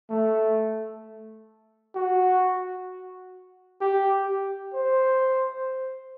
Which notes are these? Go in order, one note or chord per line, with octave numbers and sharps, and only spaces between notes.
A3
F#4
G4
C5